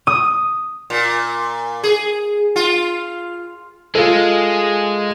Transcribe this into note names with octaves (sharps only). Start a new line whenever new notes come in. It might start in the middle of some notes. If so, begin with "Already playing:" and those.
D#6
A#2
G#4
F4
G#3 F4 A4